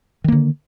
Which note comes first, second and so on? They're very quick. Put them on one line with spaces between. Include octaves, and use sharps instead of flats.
D#3 A#3 D3